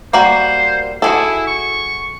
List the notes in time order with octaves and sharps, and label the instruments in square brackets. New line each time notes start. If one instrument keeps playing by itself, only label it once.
[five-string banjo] G3 A#3 F#4 [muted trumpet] C5
[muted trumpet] E4 [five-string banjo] F#4 G#4 A4
[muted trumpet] C#6